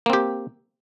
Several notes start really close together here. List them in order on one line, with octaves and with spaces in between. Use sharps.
A#3 C4 G4